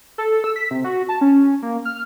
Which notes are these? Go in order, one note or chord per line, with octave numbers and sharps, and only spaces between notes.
A4
E6
B6
C3
F#4
A5
C#4
A#3
F6